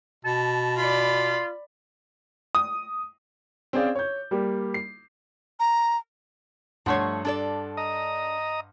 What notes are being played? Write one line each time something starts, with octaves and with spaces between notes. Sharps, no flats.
B2 A5
F4 D5 B5
D#6
C4 C#4 G#4 C5 D5 F5
C#5 G6
G3 A#3 G4
C7
A#5
G2 F3 A3 C#5 F#5 C6
D4 A4 D5
D#5 A#5 D#6